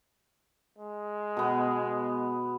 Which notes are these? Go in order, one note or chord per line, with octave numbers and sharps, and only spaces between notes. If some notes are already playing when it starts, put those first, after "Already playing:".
G#3
B2 B3